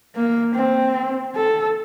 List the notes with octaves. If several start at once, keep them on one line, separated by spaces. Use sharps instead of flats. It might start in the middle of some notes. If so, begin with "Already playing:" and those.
A#3
C4
A4